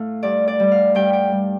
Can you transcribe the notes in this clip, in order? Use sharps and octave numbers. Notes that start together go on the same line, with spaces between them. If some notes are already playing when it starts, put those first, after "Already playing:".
Already playing: A2 A3 F5
G2 D5
D5
G3
F5
G2 G5
G5
G3